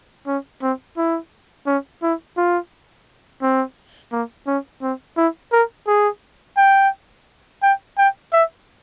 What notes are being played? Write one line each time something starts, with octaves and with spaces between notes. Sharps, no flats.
C#4
C4
E4
C#4
E4
F4
C4
A#3
C#4
C4
E4
A#4
G#4
G5
G5
G5
E5